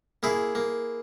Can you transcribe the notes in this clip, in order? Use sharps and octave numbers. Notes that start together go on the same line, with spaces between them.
A#3 E4 G#4
A#3